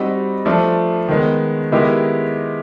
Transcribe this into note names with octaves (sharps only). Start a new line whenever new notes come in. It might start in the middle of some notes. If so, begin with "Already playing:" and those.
Already playing: G3 C4 D#4 F#4
F3 A3 D4 F4
D#3 G#3 B3
D#3 G#3 B3 E4 G4